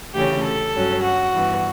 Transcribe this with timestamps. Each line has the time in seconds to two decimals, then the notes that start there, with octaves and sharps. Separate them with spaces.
0.14 D2 C#3 E3 A3 C#4 G4
0.44 A4
0.74 G2 F#3 C#4
1.03 F#4
1.33 G2 E3 B3